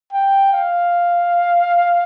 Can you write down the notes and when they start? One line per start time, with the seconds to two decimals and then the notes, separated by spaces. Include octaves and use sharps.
0.13 G5
0.53 F5